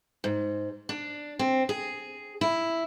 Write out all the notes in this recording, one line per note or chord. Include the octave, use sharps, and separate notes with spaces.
G#2
D4
C4
G#4
E4